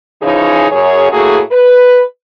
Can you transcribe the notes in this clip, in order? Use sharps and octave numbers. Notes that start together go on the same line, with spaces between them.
C#3 E3 F3 D#4 G#4 C#5
F#2 G#4 C#5
A2 A3 A#3 F#4 G#4
B4